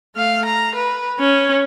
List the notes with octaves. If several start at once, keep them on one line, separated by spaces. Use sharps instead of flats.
A3 F5
A#5
B4
C#4